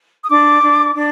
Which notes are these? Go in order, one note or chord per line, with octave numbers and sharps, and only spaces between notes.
D#6
D4 D6
D4
D4